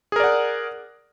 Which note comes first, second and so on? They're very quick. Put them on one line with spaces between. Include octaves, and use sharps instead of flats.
G#4 A#4 D5 F#5